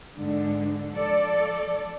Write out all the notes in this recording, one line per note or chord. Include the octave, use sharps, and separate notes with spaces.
G#2 D3
F3 A4 D5